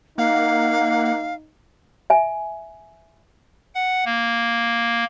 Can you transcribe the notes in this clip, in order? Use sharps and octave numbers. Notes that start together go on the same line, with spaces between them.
A#3 D#4 F5 F#5
E5 G#5
F#5
A#3